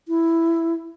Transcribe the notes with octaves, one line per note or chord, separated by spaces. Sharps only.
E4